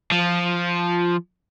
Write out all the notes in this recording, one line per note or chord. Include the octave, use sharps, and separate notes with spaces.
F3